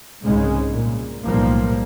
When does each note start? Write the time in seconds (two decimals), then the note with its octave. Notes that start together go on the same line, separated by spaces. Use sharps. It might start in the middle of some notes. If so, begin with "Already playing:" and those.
0.23 C2 G#2 C#3 G#3
0.70 A#2
1.25 B1 A2 F3 G3 A#3